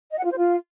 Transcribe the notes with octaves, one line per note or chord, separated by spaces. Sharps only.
D#5
F#5
F4
C5
F4